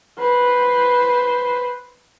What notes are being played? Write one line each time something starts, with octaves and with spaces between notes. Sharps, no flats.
B4 C5